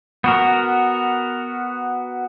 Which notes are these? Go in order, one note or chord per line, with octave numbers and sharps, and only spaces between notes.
B3 F#4 A#4